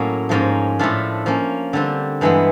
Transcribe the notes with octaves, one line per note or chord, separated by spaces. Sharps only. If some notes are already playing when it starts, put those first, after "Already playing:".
Already playing: A2 F#3 A#3 C#4
G#2 F3 A#3 C#4
A2 F3 A3 D4 F4
F3 A#3 C#4
D3 G3 C4
G2 E3 G#3 B3 E4